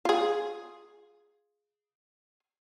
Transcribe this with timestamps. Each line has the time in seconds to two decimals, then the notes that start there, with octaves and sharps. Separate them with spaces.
0.05 F4 G#4